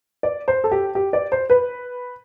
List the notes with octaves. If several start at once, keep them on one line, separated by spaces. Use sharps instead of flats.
D5
C5
A4
G4
G4
D5
C5
B4